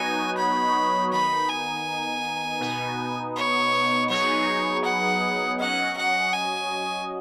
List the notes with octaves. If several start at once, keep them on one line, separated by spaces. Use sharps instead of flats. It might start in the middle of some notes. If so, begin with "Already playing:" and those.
Already playing: F#3 B3 D#4 F#4 C#5 G#5
B5
D#3 B3 D#4 B5
G#5
B2 B3 D#4
C#5
F#3 B3 D#4 G#4 C#5
F#5
F#3 C#4 F#4 D#5 F#5
F#5
G#5